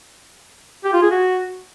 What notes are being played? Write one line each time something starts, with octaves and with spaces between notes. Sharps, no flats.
G4
F4
G#4
F#4